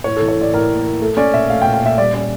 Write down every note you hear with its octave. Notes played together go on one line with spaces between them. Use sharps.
A2 C#5
A4
E3
C#5
A2 D5
A2 A#4
A#3
A#3
A3 A4
C#4 D5
A#2 E5
A3 F5
G5
A#2
G5
A#2 E5
G3 D5
C#4 D5